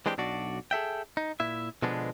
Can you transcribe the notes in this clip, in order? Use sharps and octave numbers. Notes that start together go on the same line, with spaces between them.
E3 G#3 C4 D4 G4
B1 D4 F#4 D5
G#4 A4 E5 G5
D#4
A#2 E4 E5
B2 D3 F3 G#3 B3 D4